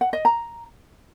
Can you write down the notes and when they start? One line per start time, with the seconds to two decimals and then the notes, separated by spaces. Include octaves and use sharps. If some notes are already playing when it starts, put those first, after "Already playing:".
0.01 F#5
0.13 D#5
0.25 A#5